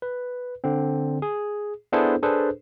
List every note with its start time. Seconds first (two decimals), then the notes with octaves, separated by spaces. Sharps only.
0.02 B4
0.64 D3 C4
1.22 G#4
1.92 B3 D4 E4 G#4 A4 C5
2.23 D4 G#4 A4 B4 C5